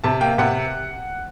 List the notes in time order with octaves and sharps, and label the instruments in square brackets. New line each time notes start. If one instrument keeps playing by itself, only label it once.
[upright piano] C3 A5
A#3 G5
C3 F#5